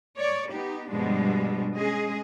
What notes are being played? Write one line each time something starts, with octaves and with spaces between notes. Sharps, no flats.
C#5 D5
B3 D#4 G4
G2 B2 F3 G3 G#3 D4
G#3 C#4 G#4 D#5